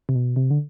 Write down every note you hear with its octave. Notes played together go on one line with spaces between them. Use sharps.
C3
B2
C3
D3